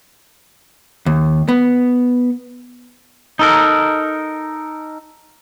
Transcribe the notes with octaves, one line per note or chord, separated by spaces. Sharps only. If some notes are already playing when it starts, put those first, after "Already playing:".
D#2
B3
D#4 A4 A#4